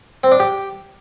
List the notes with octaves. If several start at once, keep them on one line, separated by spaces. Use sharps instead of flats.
C4
D4
G4